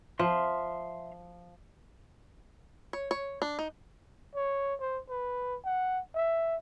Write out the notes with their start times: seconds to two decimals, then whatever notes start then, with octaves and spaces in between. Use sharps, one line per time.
0.19 F3 E5 C6 F6
2.93 C#5
3.11 C#5
3.42 D4
3.59 D#4
4.35 C#5
4.80 C5
5.09 B4
5.65 F#5
6.15 E5